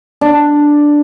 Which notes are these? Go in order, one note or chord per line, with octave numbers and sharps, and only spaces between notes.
D4